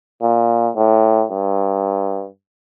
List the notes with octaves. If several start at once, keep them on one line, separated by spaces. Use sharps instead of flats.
A#2
A2
G2